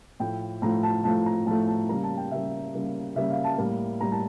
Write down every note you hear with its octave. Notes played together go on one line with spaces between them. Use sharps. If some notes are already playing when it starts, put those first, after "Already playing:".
A2 F3 A3 G5
A2 F3 A3 A#5
A5
A2 F3 A3 A5
A#5
A2 F3 A3 A5
A5
C#3 G3 A#3 A#5
A5
G5
C#3 G3 A#3 E5
C#3 G3 A#3
C#3 G3 A#3 E5
F5
A5
A2 G3 A#3
A2 G3 A#3 A#5
A5